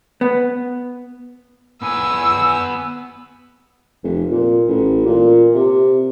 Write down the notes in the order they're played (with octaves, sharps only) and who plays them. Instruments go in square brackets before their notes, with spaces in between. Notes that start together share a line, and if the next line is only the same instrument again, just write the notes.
[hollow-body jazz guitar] B3
[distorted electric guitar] B3 G#5 [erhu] E6
[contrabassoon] F1
A#2
A1
A#2
C3